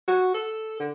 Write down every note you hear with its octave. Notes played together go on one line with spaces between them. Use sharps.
F#4
A4
D3